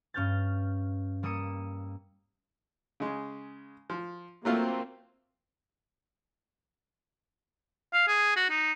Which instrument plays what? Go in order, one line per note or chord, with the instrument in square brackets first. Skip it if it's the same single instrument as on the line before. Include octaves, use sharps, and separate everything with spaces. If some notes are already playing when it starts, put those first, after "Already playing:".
[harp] G2 C#4 F6 G6 A6
G3 A#3 D#6 E6 C#7 D#7
[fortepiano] C#3 G#3
F3
[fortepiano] F#3 A3 F4 [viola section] A#3 C4
[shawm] F5
G#4
F#4
D#4